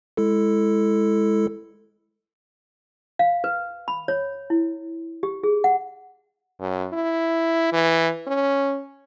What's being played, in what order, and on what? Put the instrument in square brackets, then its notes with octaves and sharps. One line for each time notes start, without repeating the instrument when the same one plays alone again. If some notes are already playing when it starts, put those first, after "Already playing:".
[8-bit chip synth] G#3 E4 A4
[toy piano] F5
B4
B5
C#5
E4
G4
G#4
F#5
[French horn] F#2
E4
E3
C#4